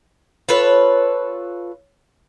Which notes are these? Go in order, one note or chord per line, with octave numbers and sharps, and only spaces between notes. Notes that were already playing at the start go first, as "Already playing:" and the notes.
F4 A4 B4 C#5